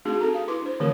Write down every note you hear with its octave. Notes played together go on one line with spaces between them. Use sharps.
A3 C4 D4 D#4 F#4 G#4
C4 A4 A#5
G4 F5
E4 B4 C6 D6
D4 C5
D3 E3 A3 C4 G4 A#4